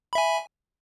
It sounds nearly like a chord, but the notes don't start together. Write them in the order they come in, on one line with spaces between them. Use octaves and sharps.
B5 E5 G#5